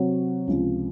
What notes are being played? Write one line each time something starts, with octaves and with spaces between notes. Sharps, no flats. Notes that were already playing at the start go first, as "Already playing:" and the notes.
Already playing: C3 F#3 C4 F#4 C#5
C#2 C3 F3